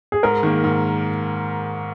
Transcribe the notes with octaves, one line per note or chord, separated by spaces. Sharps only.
G#4
G#2 A#4
D#3 A#3
G#2